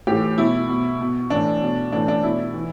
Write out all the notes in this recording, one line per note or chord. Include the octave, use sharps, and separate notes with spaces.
A2 E3 G4
B2 E4
B2
B2
A2 E3 D4
B2
A2 E3 D4
D4
B2 E4
E3